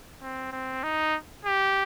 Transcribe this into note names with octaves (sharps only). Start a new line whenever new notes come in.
C4
C4
D#4
G4